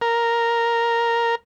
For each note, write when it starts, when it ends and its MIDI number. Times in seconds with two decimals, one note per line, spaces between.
0.01 1.35 70